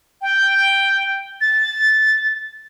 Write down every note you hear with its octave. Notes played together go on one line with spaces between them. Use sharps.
G5
A6